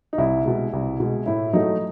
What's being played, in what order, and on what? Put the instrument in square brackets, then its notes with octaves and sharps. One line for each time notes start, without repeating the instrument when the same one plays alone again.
[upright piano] D#4
C2 E4
B2 G#3
C2
B2 G#3
A2 E4
F#3 A3 D#4